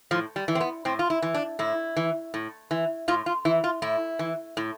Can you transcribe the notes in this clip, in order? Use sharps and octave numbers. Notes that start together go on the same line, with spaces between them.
A2 F3
G3
E3
C4
B3
A2 C4
F4
E4
E3
D4
A2 E4
E3
A2
E3
A2 F4
F4
E3 E4
F4
A2 E4
E3
A2